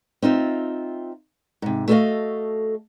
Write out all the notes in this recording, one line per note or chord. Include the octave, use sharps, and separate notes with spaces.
C4 D#4 F4 E5
G#2 C3
A3 F#4 A4 B4 D#5 F5